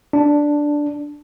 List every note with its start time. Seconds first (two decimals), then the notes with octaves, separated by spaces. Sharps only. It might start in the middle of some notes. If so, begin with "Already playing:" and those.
0.13 D4